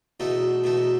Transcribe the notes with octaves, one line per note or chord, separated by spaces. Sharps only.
E2 B2 A3 D#4 A4
E2 B2 A3 D#4 A4